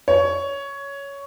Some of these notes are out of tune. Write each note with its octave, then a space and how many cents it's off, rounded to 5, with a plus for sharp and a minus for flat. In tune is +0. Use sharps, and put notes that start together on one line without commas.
C#5 +10